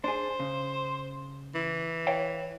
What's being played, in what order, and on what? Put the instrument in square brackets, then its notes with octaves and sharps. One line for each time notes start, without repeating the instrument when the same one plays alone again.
[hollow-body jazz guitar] D4 G#4 [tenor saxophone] C5
[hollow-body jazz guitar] C#3
[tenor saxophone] E3
[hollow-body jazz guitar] C#5 F5 G5